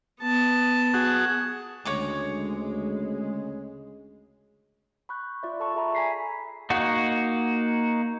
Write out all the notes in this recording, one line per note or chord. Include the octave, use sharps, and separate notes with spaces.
B3 A5
F#4 G#4
D2 C#3 G#3 C#5 A#5 D6
B5 C#6 F#6 G6
F4 D5 E5
A4 A5 C#6
G#4 A4 E5 A#5 B5
G#5 A#5 B6 C7
A#3 D#4 F#4